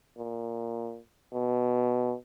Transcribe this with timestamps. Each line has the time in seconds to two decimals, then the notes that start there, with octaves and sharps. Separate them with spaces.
0.17 A#2
1.33 B2